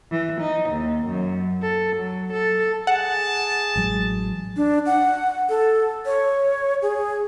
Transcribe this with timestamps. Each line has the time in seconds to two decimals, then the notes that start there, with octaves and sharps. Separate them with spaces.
0.11 E3
0.41 D#4
0.69 D#2
1.06 F#2
1.62 A4
1.96 F#3
2.32 A4
2.87 G#4 F#5 A5
3.76 A1 F#3 G#3
4.57 D4
4.86 F#5
5.49 A4
6.05 C#5
6.82 G#4